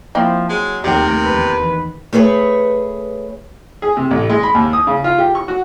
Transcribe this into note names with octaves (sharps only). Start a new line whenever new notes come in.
F3 A#3 C4 E4
F#3 G#3
D#2 C3 A3 G4 A#4 G5
E2 D#3 B4
A3 G#4 B4 C#5
G#4
C3
A1
G#3
B5
D#2
D#6
C#3
F4
G4
C#6
F#4